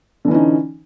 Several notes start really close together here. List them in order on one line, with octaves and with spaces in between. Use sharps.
D3 E3 C#4 D#4